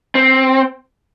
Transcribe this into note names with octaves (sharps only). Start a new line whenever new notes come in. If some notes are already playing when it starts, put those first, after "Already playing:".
C4